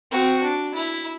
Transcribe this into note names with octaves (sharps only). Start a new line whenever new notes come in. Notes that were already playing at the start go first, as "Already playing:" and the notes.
C4 F#4
D4
E4